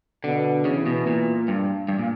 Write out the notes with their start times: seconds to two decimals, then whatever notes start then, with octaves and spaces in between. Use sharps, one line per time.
0.24 B2 D3
0.65 C#3 E3
0.86 B2
1.07 A#2
1.48 G2
1.88 G2
1.99 A#2